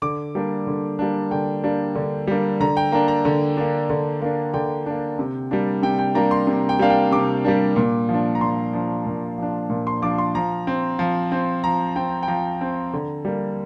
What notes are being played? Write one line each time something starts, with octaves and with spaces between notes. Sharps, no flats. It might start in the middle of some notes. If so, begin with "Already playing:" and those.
D3 D6
G3 A#3 D4
D3
G3 A#3 D4
D3 G5
G3 A#3 D4
D3
G3 A#3 D4
D3 A#5
G5
A#3 D4 A#5
A#5
D3
A#3 D4
D3
A#3 D4
D3 G5
A#3 D4
C3
G3 A#3 D4
C3 G5
G5
G3 A#3 D4 A#5
C6
C3
G5
G3 A#3 D4 F5
G5
C3 D6
G3 A#3 D4
A#2
F3
D4
A#5
A#2 C6
F3 D4
A#2
F3 D4
A#2
C6
F3 D4 D6
C6
F3 A#5
C4
F3
C4
F3 A#5
C4 G5
G5
F3 A#5
C4
D3
G3 A#3